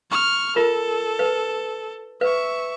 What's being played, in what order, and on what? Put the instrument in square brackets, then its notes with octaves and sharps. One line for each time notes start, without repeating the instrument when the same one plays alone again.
[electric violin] C#6 F6
[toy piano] F4 A#4 [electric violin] A4
[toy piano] B4
[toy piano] B4 [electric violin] E5 C#6